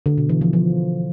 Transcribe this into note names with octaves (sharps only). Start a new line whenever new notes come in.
D3
B2
E3
F3
F3